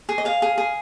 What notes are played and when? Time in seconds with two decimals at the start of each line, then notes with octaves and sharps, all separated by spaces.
0.09 G#4
0.18 D#5
0.25 G#4 F5
0.42 G#4
0.58 G#4